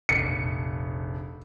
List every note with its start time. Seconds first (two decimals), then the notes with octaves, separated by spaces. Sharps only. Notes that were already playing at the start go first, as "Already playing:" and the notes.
0.09 F1 A#1 C#7